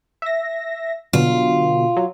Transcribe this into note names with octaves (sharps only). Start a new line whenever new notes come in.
E5 A#6
B2 D3 F#3 F4
F#3